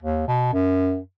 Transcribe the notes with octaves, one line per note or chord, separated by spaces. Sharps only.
D#2
B2
F#2